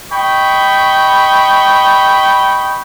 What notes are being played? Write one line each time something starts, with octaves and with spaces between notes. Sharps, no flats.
D#5 G5 B5 C#6